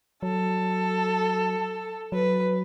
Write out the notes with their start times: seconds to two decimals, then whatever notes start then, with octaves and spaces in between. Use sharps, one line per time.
0.23 F#3 A4
2.12 F#3 B4